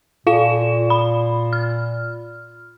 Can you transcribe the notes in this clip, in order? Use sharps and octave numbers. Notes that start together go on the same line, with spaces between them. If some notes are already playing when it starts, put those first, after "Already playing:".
A#2 F4 F5 E7
B5
F6